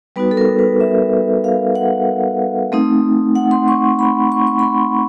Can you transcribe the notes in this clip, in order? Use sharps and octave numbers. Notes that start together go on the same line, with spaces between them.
G3 B3 D#4 F#4 B4
A4
A#4
B4
E5
F5
F#5
A3 C4 D#4
F#5
C6
C#6
B5
C#6
C#6
B5
C6